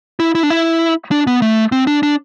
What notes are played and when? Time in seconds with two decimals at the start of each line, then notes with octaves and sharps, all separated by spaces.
0.20 E4
0.35 E4
0.43 D4
0.50 E4
1.11 D4
1.27 B3
1.42 A3
1.72 C4
1.87 D4
2.03 D4